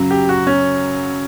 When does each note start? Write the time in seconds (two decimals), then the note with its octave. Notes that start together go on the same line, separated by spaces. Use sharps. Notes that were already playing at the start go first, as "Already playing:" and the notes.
Already playing: F#2 C#3 F#3
0.11 G4
0.29 F#4
0.47 C#4